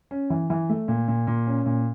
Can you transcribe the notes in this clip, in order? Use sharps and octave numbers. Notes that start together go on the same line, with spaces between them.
C#4
E3
E3
A3
A#2
A#2
A#2
C#4
A#2